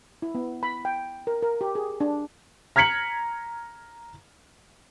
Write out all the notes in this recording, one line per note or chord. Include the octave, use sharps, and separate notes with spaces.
E4
B3
B5
G5
A#4
A#4
G4
G#4
D4
A#5 F6 G#6 B6 C#7 F#7